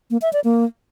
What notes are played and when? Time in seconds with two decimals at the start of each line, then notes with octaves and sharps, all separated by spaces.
0.11 A#3
0.22 E5
0.33 D5
0.44 A#3